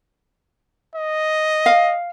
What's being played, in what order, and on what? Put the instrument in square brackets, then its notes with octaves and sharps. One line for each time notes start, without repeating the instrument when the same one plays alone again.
[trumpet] D#5
[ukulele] F5